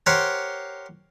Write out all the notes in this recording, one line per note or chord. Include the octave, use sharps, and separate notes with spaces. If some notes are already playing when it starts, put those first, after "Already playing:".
G4 A#4 C5 C#5 F#5